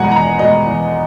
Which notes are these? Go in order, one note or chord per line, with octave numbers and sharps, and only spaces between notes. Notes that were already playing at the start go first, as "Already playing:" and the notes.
Already playing: E2 B2 G#3 F#5 G#5 A#5
E2 A#5
B2 G#3 D#5
E2